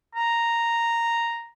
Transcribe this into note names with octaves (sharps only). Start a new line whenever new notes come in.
A#5